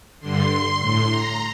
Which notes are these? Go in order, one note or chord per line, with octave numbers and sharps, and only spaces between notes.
G2 D3 C6
A2 C6
A#5